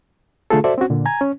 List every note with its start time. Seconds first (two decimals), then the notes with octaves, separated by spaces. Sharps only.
0.50 D3 A3 F4 G#4 A4
0.64 F#4 A4 C5 D5 E5
0.78 C4 C#4 F#4
0.90 A#2 D3
1.06 G#5 A#5 G#6
1.21 C#4